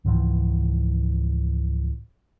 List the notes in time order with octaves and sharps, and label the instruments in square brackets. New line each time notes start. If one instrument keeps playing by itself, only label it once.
[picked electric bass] C#2 G#2 E3 F3